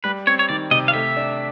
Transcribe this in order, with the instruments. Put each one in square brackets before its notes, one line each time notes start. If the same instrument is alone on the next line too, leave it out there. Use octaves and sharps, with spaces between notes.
[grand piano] G3 [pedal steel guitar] B4
[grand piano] C4 [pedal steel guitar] C#5
[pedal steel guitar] C#5
[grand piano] D#3 [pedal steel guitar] D5
[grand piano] C3 [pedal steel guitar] D#5
[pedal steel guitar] F5
[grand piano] A3 [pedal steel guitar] E5
[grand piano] D4